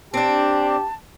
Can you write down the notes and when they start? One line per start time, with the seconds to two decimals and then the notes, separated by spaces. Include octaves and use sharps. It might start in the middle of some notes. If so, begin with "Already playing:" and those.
0.14 C4 D4 G4 A5